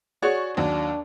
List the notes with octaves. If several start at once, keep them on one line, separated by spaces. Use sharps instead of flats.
F#4 G#4 C#5 D5 C#6
D#2 F#3 D4